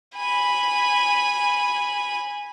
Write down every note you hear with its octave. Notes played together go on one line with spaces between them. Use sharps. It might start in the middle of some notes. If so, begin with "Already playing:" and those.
G#5 B5